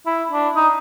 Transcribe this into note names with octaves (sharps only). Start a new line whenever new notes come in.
E4
D4
D#4